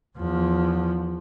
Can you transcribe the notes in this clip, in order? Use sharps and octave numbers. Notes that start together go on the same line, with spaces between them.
E2 F3